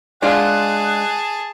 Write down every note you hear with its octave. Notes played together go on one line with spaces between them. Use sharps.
G#3 D4 F4 G#4 D#5 F#5 A5